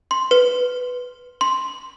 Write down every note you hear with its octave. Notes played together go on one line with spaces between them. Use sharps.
C6
B4
C6